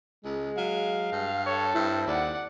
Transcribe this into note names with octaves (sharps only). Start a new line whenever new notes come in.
C#2 G#3
F#3 F5
G2
A4 C#5
G2 C4 E4
D#2 D5 F#5